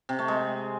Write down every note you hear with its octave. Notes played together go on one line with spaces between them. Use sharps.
C3
A3
G#3